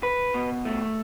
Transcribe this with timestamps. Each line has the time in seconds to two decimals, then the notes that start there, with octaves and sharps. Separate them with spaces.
0.03 B4
0.34 B2
0.65 A3